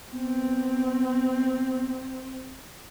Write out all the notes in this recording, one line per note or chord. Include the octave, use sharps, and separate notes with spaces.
B3 C4